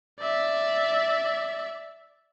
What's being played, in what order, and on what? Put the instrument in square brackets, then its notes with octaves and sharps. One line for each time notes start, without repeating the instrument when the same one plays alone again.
[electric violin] D5 E5